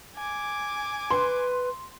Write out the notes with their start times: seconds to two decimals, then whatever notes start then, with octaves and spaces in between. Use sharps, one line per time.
0.16 G#5 D6
1.11 B4 C6